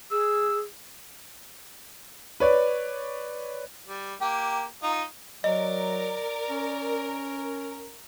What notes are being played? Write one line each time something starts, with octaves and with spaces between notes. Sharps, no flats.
G#4 E6
B4 C#5 D5
G3
A#3 G4
D#4 F4
F#3 A#4 D5 D#5
C#4